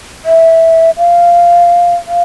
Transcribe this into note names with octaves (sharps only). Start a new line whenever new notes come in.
E5
F5
F5